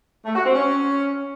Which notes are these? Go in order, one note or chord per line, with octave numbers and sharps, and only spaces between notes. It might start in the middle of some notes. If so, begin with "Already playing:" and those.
A3
F#4
C4
C#4